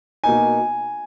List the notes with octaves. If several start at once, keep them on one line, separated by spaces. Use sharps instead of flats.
B2 A#3 D#4 G#5